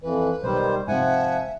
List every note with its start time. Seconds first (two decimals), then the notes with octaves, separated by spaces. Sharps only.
0.02 F2 E3 B4
0.43 B1 D#3 G3 C5
0.88 G#2 C3 F3 E5 F#5 G#5